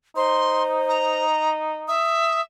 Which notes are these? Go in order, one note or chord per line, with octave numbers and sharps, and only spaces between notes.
D#4 C5 C6
A#5
E5 D#6